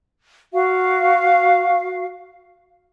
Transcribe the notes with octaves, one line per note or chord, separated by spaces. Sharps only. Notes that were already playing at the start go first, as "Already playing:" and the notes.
F#4 F5